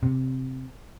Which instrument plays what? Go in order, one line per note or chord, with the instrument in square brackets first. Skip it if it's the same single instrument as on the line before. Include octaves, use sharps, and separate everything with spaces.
[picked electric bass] C3